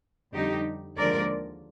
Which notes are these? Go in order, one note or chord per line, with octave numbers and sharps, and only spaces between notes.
F2 D3 G3 D#4 G4
D#2 D3 F3 G#3 A#4 D5